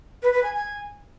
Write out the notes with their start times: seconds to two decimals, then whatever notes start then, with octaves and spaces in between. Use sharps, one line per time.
0.23 B4
0.33 B4
0.43 G#5
0.54 G#5